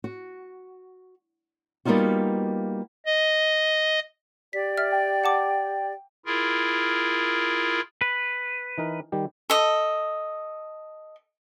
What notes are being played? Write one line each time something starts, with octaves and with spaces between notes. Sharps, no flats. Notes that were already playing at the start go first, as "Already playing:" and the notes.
F#4
G3 A#3 B3 D#4 F4 F#4
D#5
G4 D5 B6
E5 F6
G5
F#5 A5 D6
E4 F4 G#4 A#4
B4
E3 D#4 A#4
D#3 G3 G4
A4 D#5